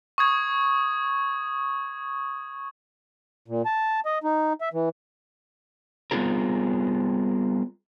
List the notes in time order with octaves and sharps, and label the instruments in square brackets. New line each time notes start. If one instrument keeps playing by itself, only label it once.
[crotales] C#6 D#6 G#6
[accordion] A#2
A5
D#5
D#4
E5
E3
[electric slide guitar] G3 B3 C4 F4 G#4 A#4